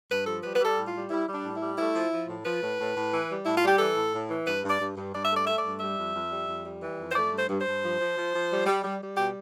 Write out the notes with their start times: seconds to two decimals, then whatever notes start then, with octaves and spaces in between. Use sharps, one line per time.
0.10 G2 B4
0.26 F3 A4
0.43 G3 B4
0.56 G3 B4
0.65 A4
0.77 A2
0.88 F4
0.94 G3
1.10 G3 E4
1.27 G3
1.33 D4
1.44 A2
1.56 E4
1.61 G3
1.78 A3 E4
1.95 F3
2.11 F3
2.28 A2
2.44 F3 B4
2.62 A2
2.79 A2
2.95 A2
3.12 E3
3.29 G3
3.45 A2 E4
3.57 G3 F4
3.68 G4
3.79 E3 A4
3.96 A2
4.13 A2
4.29 E3
4.46 G2 B4
4.63 G2
4.69 D5
4.80 G2
4.97 G2
5.14 G2 D5
5.25 E5
5.31 A3
5.36 D5
5.47 A3 E5
5.58 D5
5.64 G2
5.80 G3 E5
5.98 F2
6.15 F2
6.32 G3
6.48 F2
6.65 G3
6.82 E3
6.98 F2
7.11 C5
7.15 A3 D5
7.32 G2
7.37 C5
7.49 G2
7.60 C5
7.66 G2
7.82 F3
8.00 F3
8.16 F3
8.33 F3
8.50 G3
8.66 G3
8.83 G3
9.00 G3
9.17 B2 G4